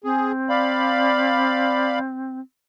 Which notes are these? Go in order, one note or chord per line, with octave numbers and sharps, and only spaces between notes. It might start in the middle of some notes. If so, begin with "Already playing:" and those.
C4 G#4
D5 F5 B5